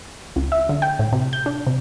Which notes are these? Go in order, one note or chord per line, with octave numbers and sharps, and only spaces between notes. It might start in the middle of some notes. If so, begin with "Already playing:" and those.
C#2
E5
D3
G5
A2
C3
G6
D4
C3